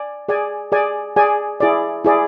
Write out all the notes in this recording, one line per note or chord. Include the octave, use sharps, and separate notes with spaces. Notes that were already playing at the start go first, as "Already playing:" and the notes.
Already playing: D5 G#5
G#4 D5 G#5
G#4 D5 G#5
G#4 D5 G#5
E4 G#4 D5
E4 G#4 D5